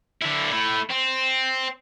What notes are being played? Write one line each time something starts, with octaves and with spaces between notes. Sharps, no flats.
D3 E4
A3 E4
C4